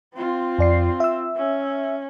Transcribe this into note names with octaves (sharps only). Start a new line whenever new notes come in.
C4 F4
F2 D5 C7
E5 E6
C#4